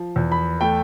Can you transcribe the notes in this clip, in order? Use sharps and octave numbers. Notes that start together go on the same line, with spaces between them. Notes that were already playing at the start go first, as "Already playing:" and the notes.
Already playing: F3
E2
B5
A3 G5